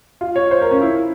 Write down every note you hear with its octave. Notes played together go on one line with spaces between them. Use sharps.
F4
C#5
C5
A#4
C#4
E4